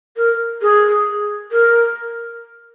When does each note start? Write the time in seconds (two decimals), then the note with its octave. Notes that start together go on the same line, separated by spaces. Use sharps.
0.17 A#4
0.62 G#4
1.52 A#4